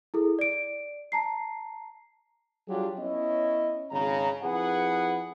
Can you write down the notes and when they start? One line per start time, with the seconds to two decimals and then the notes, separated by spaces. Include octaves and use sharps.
0.14 E4 G#4 A4
0.39 D5 D7
1.12 A5 A#5 C7
2.68 F#3 G3 D4 F4 G4 G#4
2.98 B3 C#4 E4 C#5 D#5
3.91 G#1 C#3 A#5
4.42 F2 E4 G#4 B4 F#5